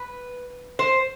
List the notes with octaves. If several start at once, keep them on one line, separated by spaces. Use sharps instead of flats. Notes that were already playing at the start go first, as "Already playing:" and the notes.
Already playing: B4
C5